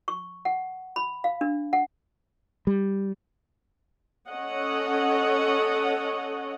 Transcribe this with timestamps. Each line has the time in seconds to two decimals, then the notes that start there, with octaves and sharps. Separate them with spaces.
0.08 C#6
0.45 F#5
0.96 B5
1.24 F5
1.41 D4
1.73 F#5
2.67 G3
4.28 C#4 A4 C#5 D#5 F#5